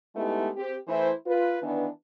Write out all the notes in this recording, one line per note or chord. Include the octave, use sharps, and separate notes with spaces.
G#3 A3 B3 D#4 E4 G4
C4 G4
E3 A3 E4 C5
F4 B4
D#3 E3 B3 D4